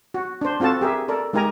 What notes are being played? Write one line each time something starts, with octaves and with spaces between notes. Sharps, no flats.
F#4
D4 C5
C4 F4 F#4 A4 A5
G4 G#4 A#4 E5
A4 A#4 D5
G#3 D#4 G4 A#4 G#5 A#5